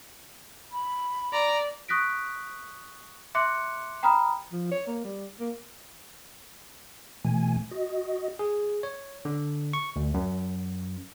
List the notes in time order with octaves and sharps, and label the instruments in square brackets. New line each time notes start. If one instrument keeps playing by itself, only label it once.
[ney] B5
[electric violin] D5 [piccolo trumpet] A#5
[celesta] C#6 D#6 F#6 A#6 B6 D7
E5 C6 D6 F#6 C#7
G5 A#5 B5 D#6 F6
[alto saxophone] F3
C#5
A#3
G3
A#3
[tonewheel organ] B2 E3 A3 G#5
F#4 D#5
[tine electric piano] G#4
C#5
D3
C#6
D2
F#2